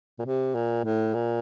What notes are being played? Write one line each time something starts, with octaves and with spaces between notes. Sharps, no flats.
A#2
C3
A#2
A2
A#2